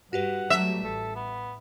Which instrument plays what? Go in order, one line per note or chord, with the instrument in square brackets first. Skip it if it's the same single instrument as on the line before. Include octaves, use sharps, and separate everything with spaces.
[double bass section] G2 [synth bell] F#4 G4 B4 [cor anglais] F#5
[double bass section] F#3 G3 A3 [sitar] E5
[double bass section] A1 [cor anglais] A4
[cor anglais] B3